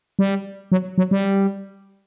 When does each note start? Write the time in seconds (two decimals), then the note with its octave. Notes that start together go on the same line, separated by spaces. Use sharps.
0.19 G3
0.72 F#3
0.98 F#3
1.11 G3